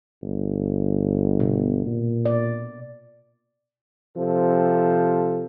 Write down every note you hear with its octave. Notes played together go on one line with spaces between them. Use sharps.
G1
B2
A#2
D5
C3 F3 C4 A4